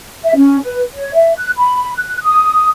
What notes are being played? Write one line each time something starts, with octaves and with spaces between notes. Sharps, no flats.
E5
C#4
B4
C#5
E5
F#6
B5
F#6
D#6